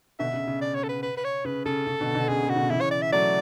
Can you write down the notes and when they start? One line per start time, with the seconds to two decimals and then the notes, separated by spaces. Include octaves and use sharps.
0.19 B2 D3 E5
0.34 C#3
0.47 C#3
0.61 D5
0.75 C#5
0.84 A4
0.89 B4
1.03 B4
1.17 B4
1.25 C#5
1.45 C#3 B4
1.65 C#3 A4
1.87 C#3
2.00 B2 D3
2.15 B2 D3
2.28 C#3 G#4
2.43 C#3
2.49 F#4
2.56 B2 D3
2.70 C#3 E3 E4
2.81 C#5
2.91 D5
3.02 E5
3.12 F#3 A3 D5